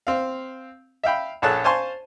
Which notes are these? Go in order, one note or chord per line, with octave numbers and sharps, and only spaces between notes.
C4 F5
E5 F5 G5 B5
A#1 G#4 A4 C#5 A5 F#6
C5 F5 G#5 A5 C6 C#6